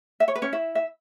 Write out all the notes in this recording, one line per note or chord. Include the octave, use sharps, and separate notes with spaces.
E5
C#5
B4
C#4 C#5
E4 E5
E5